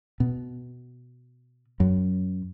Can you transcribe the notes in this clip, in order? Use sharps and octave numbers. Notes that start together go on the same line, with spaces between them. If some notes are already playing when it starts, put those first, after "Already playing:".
B2
F#2